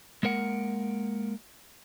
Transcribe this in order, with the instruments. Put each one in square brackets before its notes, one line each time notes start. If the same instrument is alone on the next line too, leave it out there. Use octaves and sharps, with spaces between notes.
[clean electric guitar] G#3 A#3 A#4 F#5